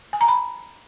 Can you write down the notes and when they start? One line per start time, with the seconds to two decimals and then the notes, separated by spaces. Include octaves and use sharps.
0.13 G#5
0.21 A#5
0.28 B5